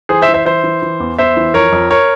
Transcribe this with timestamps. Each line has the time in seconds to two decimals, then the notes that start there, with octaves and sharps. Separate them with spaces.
0.09 E3 G#4 C5
0.22 C5 E5
0.28 E3
0.34 C5 E5
0.46 E3 C5 E5
0.64 E3
0.82 E3
1.00 E2
1.18 E2 C5 E5
1.37 E3
1.54 F2 A#4 C#5
1.72 F2
1.90 A#4 C#5